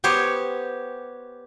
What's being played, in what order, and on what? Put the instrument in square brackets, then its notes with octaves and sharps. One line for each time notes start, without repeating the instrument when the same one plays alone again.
[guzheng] B3 G4 C5 C#5